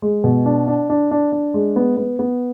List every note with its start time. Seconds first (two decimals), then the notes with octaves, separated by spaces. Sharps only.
0.02 G#3
0.24 B2
0.46 D4
0.68 D4
0.90 D4
1.11 D4
1.32 D4
1.54 G#3
1.76 B3
1.97 B3
2.19 B3